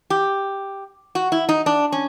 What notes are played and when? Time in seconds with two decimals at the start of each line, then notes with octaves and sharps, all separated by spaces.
0.10 G4
1.15 F#4
1.32 E4
1.49 D#4
1.66 D4
1.92 C#4